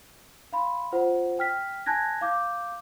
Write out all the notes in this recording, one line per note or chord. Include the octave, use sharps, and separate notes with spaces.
F5 B5 C6
F4 C5 F#5
G5 F6 B6
G#5 A5 F#6 G#6 A#6
F5 D6 G6